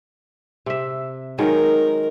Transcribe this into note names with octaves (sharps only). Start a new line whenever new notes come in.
C3 E5
D#3 F#3 G#3 A#4